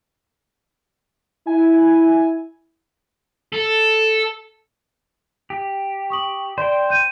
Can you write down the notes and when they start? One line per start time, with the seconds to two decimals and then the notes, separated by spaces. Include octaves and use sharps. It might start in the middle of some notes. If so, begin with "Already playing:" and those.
1.47 E4 G#5
3.54 A4
5.50 G4
6.10 C#6 D#6 F#7
6.58 C5 D5 G5
6.90 G6 D#7